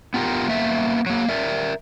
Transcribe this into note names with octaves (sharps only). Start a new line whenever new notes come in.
B3 F4 G4 A#4
A#3 B3 E5
F#3 A#3
A#4 D5 E5